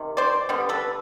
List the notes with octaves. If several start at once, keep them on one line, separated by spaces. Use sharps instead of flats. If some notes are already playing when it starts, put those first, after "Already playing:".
Already playing: C3 D#3
C5 D5
D3 G3 B3
A4 B4